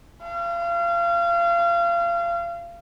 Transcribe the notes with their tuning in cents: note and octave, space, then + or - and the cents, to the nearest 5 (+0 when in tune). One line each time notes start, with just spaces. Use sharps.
F5 -30